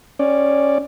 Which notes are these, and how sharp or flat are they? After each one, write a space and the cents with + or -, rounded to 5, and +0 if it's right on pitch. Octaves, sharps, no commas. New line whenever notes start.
C#4 -10 D5 +0